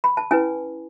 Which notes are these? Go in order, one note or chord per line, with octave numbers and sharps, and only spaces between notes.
B5
A5
C#4 E4 B4 G#5